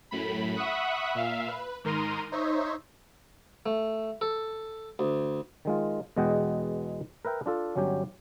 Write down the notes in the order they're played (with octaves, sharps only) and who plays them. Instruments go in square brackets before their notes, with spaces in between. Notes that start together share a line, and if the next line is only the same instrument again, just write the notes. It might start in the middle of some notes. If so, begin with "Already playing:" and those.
[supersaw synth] F#2 A2 B5
E5 F#5 B5 C#6 D#6 F#6
A#2 E5 F5
B4
G#2 D#3 A#4 A#5 C6 D#7
D#4 C5 C#5 E5
[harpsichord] A3
A4
D2
[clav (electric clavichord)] D#3 G#3 F4
E2 B2 G#3 D#5 F#5 G5
A#4 B4 E5 G5
D4 F4 A4
G1 F#3 C#4 G4 G5